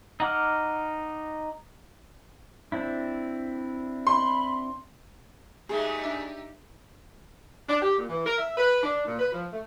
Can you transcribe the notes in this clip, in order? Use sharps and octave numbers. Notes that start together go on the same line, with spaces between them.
D#4 F#5 D6 F6
C4 D4 E4
B5 C6
A#2 G#3 A3 D#4 G4 G#4
D4 E5 E6
D4
G4
A#2
E3
A#4
E5
B4
D4
A#2
B4
F3
A3